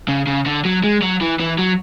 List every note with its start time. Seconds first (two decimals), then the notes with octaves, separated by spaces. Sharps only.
0.08 C#3
0.27 C#3
0.46 D3
0.65 F#3
0.84 G#3
1.02 F#3
1.21 E3
1.40 E3
1.58 F#3